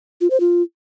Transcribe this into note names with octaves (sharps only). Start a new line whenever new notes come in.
F4
C5
F4